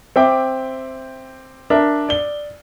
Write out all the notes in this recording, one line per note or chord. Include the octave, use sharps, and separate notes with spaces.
C4 E5 G5 D6
D4 A#4 E5
D5 G7